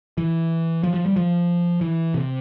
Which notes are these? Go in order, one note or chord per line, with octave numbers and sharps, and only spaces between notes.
E3
F3
F3
G3
F3
E3
C3